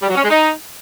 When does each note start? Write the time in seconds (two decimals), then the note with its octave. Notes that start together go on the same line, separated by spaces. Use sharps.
0.01 G3
0.08 F#3
0.15 C#4
0.22 G#3
0.29 D#4